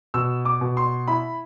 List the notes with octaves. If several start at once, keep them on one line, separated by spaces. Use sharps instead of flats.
B2 E6
D6
B2
C6
E4 B5